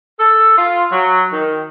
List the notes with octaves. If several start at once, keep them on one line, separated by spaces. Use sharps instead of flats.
A4
F4
F#3
D#3